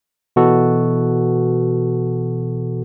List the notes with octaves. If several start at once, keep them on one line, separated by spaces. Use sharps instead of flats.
B2 E3 F#4 A4